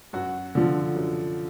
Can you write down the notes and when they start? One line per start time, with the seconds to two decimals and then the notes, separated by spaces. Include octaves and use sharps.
0.13 F#2 F#4
0.55 D3 F3
0.96 F#2